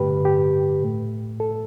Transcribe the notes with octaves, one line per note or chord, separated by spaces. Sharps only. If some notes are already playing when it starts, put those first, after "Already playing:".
Already playing: G2 D3 A3 G4 B4
G4
A2 A3
A4